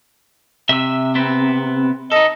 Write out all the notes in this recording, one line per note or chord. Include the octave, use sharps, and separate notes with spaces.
C3 E5 E6
B3 C4 E5
D#4 A4 D#5